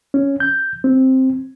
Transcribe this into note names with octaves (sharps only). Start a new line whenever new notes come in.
C#4
G6
C4